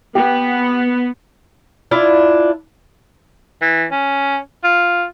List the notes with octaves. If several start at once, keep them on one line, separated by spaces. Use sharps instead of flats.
B3 G4
D4 E4 F4
E3
C#4
F4